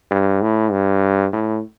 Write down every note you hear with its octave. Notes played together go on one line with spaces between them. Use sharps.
G2
A2
G2
A2